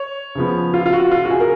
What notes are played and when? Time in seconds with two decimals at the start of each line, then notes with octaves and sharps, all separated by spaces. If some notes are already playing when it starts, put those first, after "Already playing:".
Already playing: C#5
0.35 C#3 F3 B3
0.74 F4
0.86 F4
0.93 F#4
1.11 F4
1.25 F#4
1.30 G#4
1.40 A#4